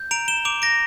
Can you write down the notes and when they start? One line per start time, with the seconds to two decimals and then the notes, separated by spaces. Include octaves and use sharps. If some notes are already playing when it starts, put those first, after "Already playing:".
Already playing: G6
0.11 A#5 D7 F7
0.28 E7 G7
0.45 D6 D7 F7
0.62 A#6 D7